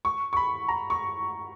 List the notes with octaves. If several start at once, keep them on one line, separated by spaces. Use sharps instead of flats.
C#6
C#6
B5
A#5
C#6